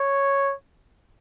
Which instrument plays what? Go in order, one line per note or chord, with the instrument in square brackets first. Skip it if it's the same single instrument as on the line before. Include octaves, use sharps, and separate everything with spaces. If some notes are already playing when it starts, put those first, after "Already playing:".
Already playing: [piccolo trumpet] C#5